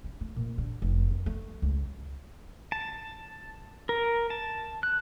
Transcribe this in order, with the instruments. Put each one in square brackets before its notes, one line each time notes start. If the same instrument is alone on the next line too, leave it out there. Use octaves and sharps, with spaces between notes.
[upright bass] C#4
A3
A#2
D3
F1
F#2
A3
C#2
[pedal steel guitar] A5
A#4
A5
F#6